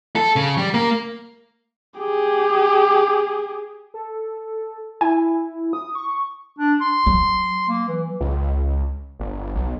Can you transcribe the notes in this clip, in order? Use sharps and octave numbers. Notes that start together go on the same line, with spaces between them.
A4
C#3
G3
A#3
G4 G#4
A4
E4 G#5
D#6
C#6
D4
C6
F#3
A#3
E3
C#2
G1
B1